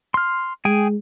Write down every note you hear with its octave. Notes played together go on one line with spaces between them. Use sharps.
C6 F6
G#3 G#4 G5 G#5